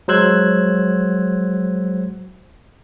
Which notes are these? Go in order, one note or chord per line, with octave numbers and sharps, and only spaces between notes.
F#3 G#3 C5 E6 F#6 G#6